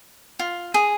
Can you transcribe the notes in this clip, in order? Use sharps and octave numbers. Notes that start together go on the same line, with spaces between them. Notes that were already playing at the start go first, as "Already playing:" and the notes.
F4
G#4